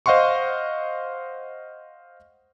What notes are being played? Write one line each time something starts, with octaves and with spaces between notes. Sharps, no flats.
C5 D#5 F5 F#5 C6 C#6